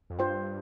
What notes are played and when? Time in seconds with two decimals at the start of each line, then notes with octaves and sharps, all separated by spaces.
0.10 F2
0.18 G2 F4 C5 G5